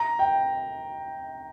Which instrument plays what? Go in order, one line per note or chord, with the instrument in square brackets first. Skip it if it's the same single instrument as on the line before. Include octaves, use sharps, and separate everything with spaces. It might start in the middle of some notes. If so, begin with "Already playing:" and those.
Already playing: [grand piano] A#5
G5